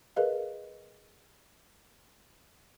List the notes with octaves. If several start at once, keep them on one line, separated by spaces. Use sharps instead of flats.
G#4 A#4 B4 D#5 F5